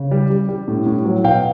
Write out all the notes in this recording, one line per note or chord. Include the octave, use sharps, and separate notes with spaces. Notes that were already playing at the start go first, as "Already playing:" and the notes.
Already playing: C#3
G3
G3
G3
A2
A2
F#3
B2 F5 G5